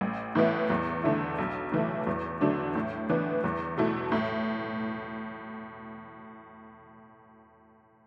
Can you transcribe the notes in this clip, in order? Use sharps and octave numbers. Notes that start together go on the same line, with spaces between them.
A1
A2 E3 B3 E4
E2
D3 A3 E4
B1
A2 E3 A3
E2
D3 F#3 A3 D4
A2
E3 B3 D4
E2
B2 A3 E4
A2